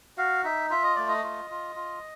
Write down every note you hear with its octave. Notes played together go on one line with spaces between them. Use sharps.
F#4 F5
D#4 E5
F4 E5
D#5
A3 D5
D#5
F4
F4
F4